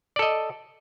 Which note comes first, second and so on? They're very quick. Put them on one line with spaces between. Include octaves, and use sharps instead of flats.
D5 A4 D#5